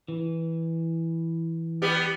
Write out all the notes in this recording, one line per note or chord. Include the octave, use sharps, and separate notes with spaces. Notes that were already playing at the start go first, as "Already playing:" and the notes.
E3
G3 B3 G4